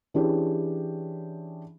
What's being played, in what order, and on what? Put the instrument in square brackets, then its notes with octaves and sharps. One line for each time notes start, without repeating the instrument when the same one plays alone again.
[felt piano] E3 C#4 D4 G4 G#4